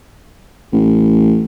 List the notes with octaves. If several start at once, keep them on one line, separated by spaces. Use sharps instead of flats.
A1